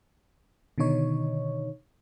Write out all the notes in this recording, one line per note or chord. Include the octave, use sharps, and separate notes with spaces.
B2 D3 D#3 D#4 C#5